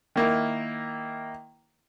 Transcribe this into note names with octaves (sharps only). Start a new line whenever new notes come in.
D#3 A#3 E4